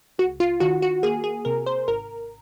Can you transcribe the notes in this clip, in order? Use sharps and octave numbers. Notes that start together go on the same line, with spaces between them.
C#2 F#4
F4
D#3 F#4
F#4
A#3 G#4
G#4
C3 A#4
C5
G#1 A#4